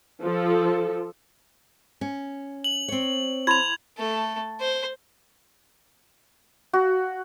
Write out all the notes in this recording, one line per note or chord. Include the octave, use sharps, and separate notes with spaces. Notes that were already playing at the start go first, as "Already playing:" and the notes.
F3 A4
C#4
F#7
C4 C#5
E4 B5 C6 G#6 F7
A3 A4
C5
F#4